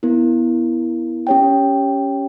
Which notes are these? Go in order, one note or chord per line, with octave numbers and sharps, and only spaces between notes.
B3 E4 A#4
C#4 G4 C#5 G5